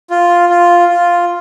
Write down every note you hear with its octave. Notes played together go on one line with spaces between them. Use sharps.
F4
F4
F4